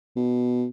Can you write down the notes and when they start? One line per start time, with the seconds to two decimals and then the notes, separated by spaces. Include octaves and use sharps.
0.16 B2